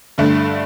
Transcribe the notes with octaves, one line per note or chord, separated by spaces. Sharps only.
G2 D3 A3